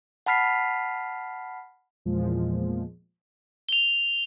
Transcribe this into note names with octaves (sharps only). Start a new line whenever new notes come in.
F#5 A5 B5 F6 B6 C7
E2 A#2 F3 G#3
F7 G7